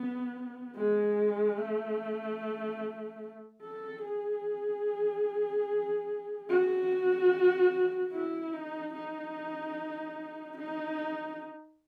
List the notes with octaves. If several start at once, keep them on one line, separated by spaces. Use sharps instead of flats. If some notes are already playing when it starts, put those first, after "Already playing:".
Already playing: B3
G#3
A3
A4
G#4
F#4
E4
D#4
D#4
D#4